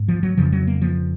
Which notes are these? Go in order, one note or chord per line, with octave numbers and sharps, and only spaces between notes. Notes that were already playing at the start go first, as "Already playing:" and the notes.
Already playing: G#2
F3
F#3
F2 C#3 F3
F#3
A#3
F3